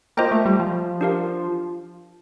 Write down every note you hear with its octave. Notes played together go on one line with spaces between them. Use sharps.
A#3 F4 C5 D#5 G5
A3
G3
F3
D4 G4 A#4 F5